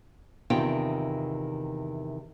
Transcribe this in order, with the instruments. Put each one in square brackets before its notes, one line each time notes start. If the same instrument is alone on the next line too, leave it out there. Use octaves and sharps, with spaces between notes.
[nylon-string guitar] E2 C3 D#3 F4 G5